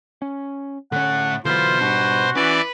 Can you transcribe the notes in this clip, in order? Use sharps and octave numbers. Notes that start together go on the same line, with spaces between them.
C#4
A2 D3 C#4 C#5 F#5
B2 D3 E3 F#3 F4 B4 C5
G#2 G3 D4 F#4
E3 C#4 B4 D5